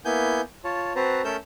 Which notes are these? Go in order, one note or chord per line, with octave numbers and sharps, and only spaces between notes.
A#3 B3 E4 G#5 G6
F4 C#5 A5
C4 F#4 B4 C5 A5 A#5
A3 C#4 A4 A#4 E6 G6